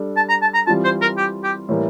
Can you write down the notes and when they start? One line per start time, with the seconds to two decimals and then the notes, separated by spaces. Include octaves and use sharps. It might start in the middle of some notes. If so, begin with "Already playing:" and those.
Already playing: G3 D4 A4
0.17 A5
0.29 A#5
0.42 A5
0.54 A#5
0.67 E3 G3 C4 F4 A5
0.84 C5
1.01 A#4
1.18 G4
1.44 G4
1.69 A2 E3 G3 A#3